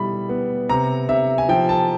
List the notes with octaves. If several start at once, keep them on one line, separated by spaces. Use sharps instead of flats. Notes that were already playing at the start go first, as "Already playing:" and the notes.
Already playing: B2 G3 E4 B5
B3
C3 A#5
C3 E5
G#5
F3 G5
A5